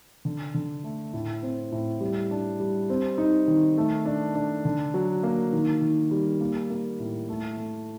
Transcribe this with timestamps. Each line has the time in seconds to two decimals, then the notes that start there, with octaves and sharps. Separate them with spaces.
0.25 D3
0.54 D3
0.84 A3
1.13 A2
1.43 C4
1.72 A2
2.01 G3
2.31 D4
2.60 G3
2.90 C4
3.18 D#4
3.47 D#3
3.77 A3
4.06 D4
4.35 D4
4.65 D3
4.94 F#3
5.23 A#3
5.53 D#3
5.81 D#3
6.11 G3
6.41 A#3
6.70 A#3
7.00 A2
7.29 A3
7.57 A3